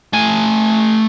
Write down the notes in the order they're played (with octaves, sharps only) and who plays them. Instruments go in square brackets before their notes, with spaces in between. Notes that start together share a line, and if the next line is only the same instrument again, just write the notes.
[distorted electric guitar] A3 G#5